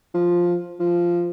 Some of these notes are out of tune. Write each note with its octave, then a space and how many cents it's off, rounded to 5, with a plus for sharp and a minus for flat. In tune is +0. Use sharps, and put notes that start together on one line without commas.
F3 +5
F3 -10